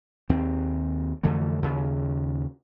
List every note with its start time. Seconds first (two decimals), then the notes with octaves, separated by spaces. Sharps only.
0.29 D#2 C4
1.23 F2 D3 E3 A3
1.62 D#2 C#3